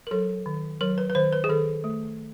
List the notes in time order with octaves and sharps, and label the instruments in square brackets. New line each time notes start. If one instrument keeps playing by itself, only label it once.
[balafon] A#4
F#3 A4
D#3
F#3 A#4
B4
B4
D#3 C5
B4
G#4
D#3 A4
A3